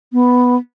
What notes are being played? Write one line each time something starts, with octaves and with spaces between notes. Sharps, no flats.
B3